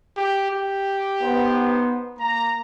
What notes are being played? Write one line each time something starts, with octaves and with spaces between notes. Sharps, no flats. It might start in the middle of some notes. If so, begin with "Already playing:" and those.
G4
G4
B3 D#4 C5
A#3 A#5